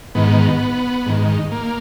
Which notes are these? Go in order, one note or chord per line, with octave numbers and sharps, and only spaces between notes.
G#2 D#3 B3
G#2 D#3
A#3